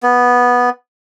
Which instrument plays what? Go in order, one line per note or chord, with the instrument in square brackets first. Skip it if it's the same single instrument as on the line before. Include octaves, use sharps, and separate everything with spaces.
[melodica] B3